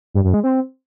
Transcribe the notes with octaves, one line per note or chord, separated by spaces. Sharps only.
G2
F#2
G#3
C4